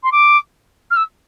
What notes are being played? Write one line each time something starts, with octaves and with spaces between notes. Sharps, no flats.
C6
D6
F6
E6